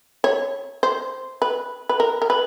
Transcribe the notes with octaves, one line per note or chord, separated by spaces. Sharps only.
C#5
C5
B4
B4
A#4
A#4
B4